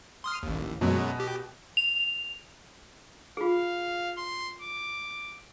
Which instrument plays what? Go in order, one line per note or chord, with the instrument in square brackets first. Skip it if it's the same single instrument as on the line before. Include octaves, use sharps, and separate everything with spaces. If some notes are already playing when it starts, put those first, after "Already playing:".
[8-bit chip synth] C6 D#6 F6
A1 D#2
[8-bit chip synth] F#2 F#3 G#3 [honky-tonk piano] B2
[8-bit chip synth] G4
[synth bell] F7
[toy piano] F4 G#4 [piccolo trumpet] F5
[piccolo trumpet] C6
D6